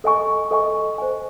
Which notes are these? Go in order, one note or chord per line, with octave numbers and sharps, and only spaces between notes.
A4 D#5 G#5 C#6
A4 D#5 G#5 C#6
C5 D#5 G#5